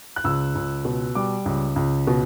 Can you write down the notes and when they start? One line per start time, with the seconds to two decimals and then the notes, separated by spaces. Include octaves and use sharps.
0.16 F#6
0.24 C#2 E6
0.55 C#2
0.85 B2
1.15 G3 D6
1.46 C#2
1.76 C#2
2.07 B2